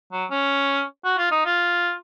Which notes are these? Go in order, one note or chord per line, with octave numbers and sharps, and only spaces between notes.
F#3
C#4
F#4
F4
D#4
F4